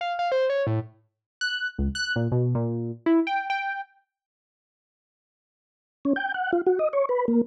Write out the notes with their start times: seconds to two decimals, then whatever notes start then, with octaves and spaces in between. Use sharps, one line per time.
0.01 F5
0.19 F5
0.32 C5
0.50 C#5
0.67 A2
1.41 F#6
1.78 C#2
1.95 F#6
2.16 A#2
2.32 B2
2.55 A#2
3.06 E4
3.27 G5
3.50 G5
6.05 C#4
6.16 G5
6.34 F#5
6.53 F4
6.67 F#4
6.79 D#5
6.93 C#5
7.09 B4
7.28 A#3